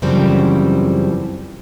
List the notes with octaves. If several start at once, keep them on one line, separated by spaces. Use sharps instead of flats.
F#2 C#3 E3 F3 G3 C4